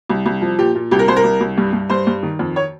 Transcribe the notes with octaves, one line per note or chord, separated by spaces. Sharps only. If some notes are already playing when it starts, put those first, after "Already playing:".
C2
C2
F3
A#2 G4
A#2
C2 G4
A#4
C2 C5
A#4
C2
C2
G2
G2
G2 C5
G2
D#3
F2
C#5